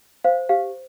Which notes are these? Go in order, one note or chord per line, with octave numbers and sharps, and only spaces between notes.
C5 F5
G4 F5